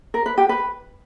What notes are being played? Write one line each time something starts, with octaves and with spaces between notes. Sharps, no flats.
A#4
B4
G4
B4